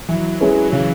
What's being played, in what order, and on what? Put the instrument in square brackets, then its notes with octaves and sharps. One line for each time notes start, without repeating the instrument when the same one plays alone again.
[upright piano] E3 [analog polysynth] F#3
[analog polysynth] F#3
[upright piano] G#3 C#4 E4 B4
[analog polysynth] F#3
[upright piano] C#3 [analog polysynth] E3